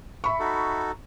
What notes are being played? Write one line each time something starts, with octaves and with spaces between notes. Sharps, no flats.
E5 B5 C#6
D#4 F#4 A4